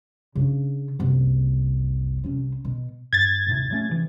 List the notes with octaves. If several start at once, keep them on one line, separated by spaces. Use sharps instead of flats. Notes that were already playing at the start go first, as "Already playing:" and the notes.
C#3 D4
F#1 C2
C2 C#4
B2
G2 G#6 A6
D#1 G#2 C3
F#3 A3 C#4
C3 E3